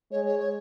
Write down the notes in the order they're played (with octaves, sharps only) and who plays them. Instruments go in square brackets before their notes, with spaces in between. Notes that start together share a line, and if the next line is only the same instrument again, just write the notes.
[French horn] G#3 [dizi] C#5
[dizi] C#5
C#5